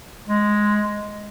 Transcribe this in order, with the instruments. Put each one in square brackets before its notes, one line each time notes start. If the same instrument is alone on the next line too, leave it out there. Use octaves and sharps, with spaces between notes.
[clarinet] G#3